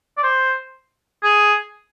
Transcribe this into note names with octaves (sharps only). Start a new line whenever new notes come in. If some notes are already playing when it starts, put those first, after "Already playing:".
D5
C5
G#4